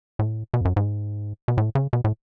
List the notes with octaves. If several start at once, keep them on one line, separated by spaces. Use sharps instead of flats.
A2
B2
F2
F#2
G#2
B2
A2
C#3
B2
A2